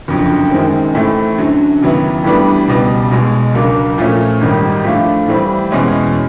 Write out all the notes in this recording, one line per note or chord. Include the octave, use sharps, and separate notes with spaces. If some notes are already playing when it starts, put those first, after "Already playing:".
F#1 F2 D3 F#3
F#2 D#3 G#3 C4
A2 E3 A3 C4
F#2 D3 F#3
D#2 C#3 F#3 B3 E4
A2 E3 G3 B3 D4
C#2 B2 G3
B1 B2 G#3
C#2 C#3 F#3 A#3 D4
A#2 F3 A3 C#4
G#1 G#2 D#3 G3
A2 F3 A3 D4 F4
A2 E3 G3 C4
E2 B2 G#3 C#4 E4